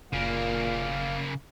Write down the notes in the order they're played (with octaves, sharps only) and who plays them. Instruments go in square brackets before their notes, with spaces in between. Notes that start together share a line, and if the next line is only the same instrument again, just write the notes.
[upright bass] F#1 [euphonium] A#2 [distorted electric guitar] C#3 A#3 [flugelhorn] F5